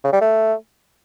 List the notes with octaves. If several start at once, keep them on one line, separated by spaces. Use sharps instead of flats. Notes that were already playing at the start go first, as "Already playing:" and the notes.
C#3
G3
A3